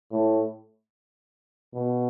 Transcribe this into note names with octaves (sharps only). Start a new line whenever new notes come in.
A2
B2